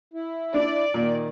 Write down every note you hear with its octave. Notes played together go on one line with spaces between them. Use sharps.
E4
D4 D5
A#2 D#3